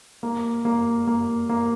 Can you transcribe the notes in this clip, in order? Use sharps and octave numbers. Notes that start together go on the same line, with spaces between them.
A#3
A#3
A#3
A#3